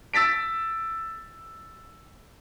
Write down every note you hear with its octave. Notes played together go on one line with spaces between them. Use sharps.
E6 A6 B6 D7